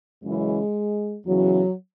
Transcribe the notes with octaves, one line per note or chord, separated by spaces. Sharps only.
F#2 C#3 E3 G#3
E2 C#3 E3 F#3